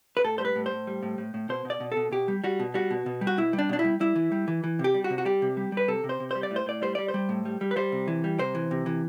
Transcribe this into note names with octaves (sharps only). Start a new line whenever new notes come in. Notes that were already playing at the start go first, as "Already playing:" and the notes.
B4
A2 A4
G3 C5
B4
A2
C5
A2
G3
A2
A2
A2
B2 C5
B2
D5
B2
A4
B2
B2 G4
G3
G3 F#4
B2
G3 F#4
B2
B2
G3
F#4
B2 E4
G3
D4
B2 D4
E4
G3
G3 E4
E3
G3
E3
E3
C3
G4
G3
F#4
C3
F#4
G3 G4
C3
G3
G3 B4
C3 A4
C3
C5
C3
G3 C5
D5
A2
C5
A2 D5
G3 C5
G3 D5
C5
G3
A2
G3
G3
B4
G3 C5
C3
E3
G3
C3 C5
E3
C3
E3